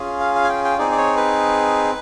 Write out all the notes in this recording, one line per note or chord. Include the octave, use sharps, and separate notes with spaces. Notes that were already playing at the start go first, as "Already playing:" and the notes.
Already playing: C#4 F4 G#4
F5
F5
G#5
G5
G5
C4 D#4 G#4 D5
D5
C#5
B4